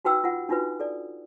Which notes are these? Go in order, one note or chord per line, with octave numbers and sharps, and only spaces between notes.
D#4 F#4 B4 G5 E6
F4 F#5
D4 D#4 F4 F#4 B4
A4 D5